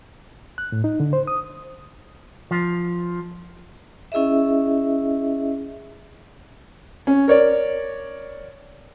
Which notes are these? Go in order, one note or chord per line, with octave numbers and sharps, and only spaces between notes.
F#6
A2
D#4
D3
C5
D#6
F3
C#4 E4 G#4 D#5 E5
C#4
A#4 C#5 D5